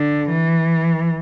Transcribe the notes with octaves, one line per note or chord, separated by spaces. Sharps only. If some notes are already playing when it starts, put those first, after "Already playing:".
Already playing: D3
E3